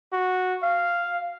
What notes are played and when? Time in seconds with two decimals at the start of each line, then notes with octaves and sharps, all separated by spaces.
0.13 F#4
0.63 F5